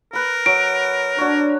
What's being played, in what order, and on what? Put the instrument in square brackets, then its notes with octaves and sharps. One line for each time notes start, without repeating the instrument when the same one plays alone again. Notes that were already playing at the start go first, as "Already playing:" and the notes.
[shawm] A#4 [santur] B4 B5
[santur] F#3 [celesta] D7
[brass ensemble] D4 [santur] F#4 C#5